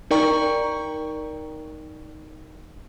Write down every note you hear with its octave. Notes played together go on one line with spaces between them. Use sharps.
D#4 A#4 D5 G5 A#5 C#6